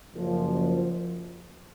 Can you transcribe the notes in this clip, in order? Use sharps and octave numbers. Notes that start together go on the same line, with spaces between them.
F#1 F#2 F3